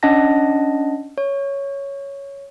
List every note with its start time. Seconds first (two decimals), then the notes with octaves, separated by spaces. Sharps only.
0.03 C#4 D4 D#5 F#5 A5 A#6
1.18 C#5